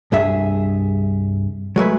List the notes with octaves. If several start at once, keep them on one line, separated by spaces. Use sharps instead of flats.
C2 G2 G#4 E5
F#3 G#3 A3 B4